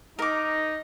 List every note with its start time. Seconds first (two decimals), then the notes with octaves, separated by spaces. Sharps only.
0.19 D#4 A#4 D6